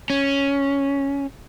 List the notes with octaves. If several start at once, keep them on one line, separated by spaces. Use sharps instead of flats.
C#4